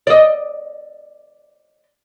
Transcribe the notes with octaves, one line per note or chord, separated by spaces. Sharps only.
D5 D#5